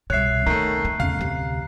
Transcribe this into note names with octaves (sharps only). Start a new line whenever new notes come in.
C2 B2 C#5 E5 F#6 C7
D#3 A3 B3 A#5 C7
A3
E2 C#3 F5
D2 C3